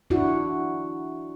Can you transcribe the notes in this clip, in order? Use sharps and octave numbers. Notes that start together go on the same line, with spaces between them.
D4 E4 F#4